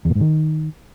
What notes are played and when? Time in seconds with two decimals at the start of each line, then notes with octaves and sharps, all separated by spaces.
0.05 E2
0.10 A#2
0.15 G#2
0.21 D#3